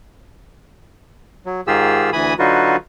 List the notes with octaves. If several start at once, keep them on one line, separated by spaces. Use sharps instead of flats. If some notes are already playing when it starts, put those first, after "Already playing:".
F#3
G#2 D#3 F4 G4 G#4 E6
D2 E3 G#5 B5 D#6
D3 F#3 D#4 F4 F#4 B4